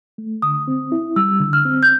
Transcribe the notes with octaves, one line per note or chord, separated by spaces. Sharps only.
A3
D3 D#6
C4
E4
G3 E6
D3
F6
C4
G6